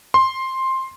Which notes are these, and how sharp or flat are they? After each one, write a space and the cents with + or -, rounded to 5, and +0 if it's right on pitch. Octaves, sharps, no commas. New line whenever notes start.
C6 +10